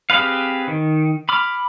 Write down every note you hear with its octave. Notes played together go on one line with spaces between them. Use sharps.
C4 G4 G#4 B4 F5
D#3
B5 D6 F6